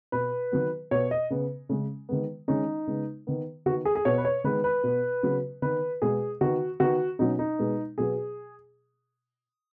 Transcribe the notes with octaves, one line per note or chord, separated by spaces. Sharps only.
B2 B3 B4
D#3 F#3 B3
B2 B3 C#5
D#5
C#3 B3
C#3 G#3 C#4
D#3 G#3 B3
D#3 G#3 C#4 D#4
C#3 G#3 B3
D#3 B3
D#3 B3 F#4
G#4
G#4
B2 B3 C#5
B4
C#5
D#3 G#3 B3 B4
B4
B2 B3
C#3 F#3 B3
D#3 B3 B4
B2 G#3 B3 G#4
D#3 B3 F#4
D#3 B3 F#4
B2 F#3 C#4 D#4
D#4
B2 G#3 B3
B2 F#3 B3 G#4